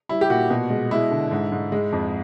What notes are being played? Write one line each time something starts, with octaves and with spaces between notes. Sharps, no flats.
G3 E4
G4
A#2 F#4
B2
G#3
G#3 E4
D3
G#2
G#2
G#3
F2